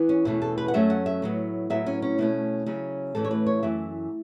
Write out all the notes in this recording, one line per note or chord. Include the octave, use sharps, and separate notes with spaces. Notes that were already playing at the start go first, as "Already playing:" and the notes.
Already playing: E3 B3
C#4
E2 B2 A3 C#4 E4
A4
B4
F#5
F#2 F#3 A3 C#4 E5
F#5
E5
A2 F#3 B3
A2 F#3 B3 E5
C#4
C#4
B2 A3 C#4 E4
C#3 F#3 C#4
A2 E3 A3 C#4 A4
C#5
B4
C#5
F#2 E3 A3 E5